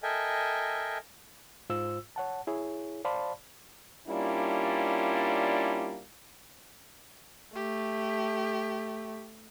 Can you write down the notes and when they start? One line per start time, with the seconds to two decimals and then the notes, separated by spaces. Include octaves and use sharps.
0.03 A4 A#4 D#5 E5 G5 G#5
1.69 G#2 F4 C5 E6
2.16 C#5 F#5 A5
2.47 E4 G#4 C#5
3.05 C5 D5 F5 A5 B5 C6
4.08 G3 A#3 C#4 D4 E4 F4
7.55 A3 G4